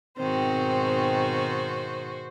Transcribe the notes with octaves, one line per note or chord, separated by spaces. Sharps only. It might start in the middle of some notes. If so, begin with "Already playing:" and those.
G#2 B2 D#3 C4 F#4 C5